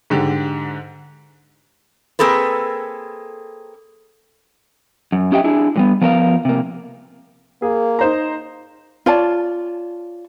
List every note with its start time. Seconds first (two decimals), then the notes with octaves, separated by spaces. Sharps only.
0.10 G#2 D3 G4
2.19 A#3 C4 G#4 A4 B4
5.12 F#2
5.32 C#4 G4 D#5 E5 G5
5.44 D4 E4 G#4
5.76 A2 G3 B3
6.01 F3 B3 A#4 E5 F5
6.45 C3 A#3
7.62 A#3 G#4
7.99 D#4 C5 A#5
9.06 F4 C#5 D5 A5